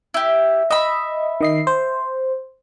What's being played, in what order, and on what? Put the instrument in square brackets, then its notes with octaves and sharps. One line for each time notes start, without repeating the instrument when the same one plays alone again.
[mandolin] E4 G4
[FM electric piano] D#5 [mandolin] E5 B5
[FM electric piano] D#3 D#5 C7
C5